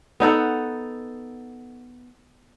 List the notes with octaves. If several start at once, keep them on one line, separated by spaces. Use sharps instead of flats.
B3 D#4 A4 F#5